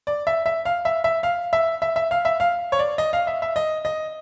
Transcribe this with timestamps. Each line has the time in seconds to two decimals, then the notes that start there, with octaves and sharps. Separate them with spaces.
0.07 D5
0.27 E5
0.46 E5
0.65 F5
0.85 E5
1.04 E5
1.23 F5
1.53 E5
1.82 E5
1.96 E5
2.11 F5
2.25 E5
2.40 F5
2.72 C#5
2.79 D5
2.98 D#5
3.13 F5
3.27 E5
3.42 E5
3.56 D#5
3.85 D#5